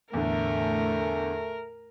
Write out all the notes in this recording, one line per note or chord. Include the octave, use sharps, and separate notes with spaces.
E2 A2 D3 A3 A#4